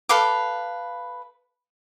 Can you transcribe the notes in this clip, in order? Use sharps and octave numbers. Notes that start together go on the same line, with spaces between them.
A4 B4 F5 D6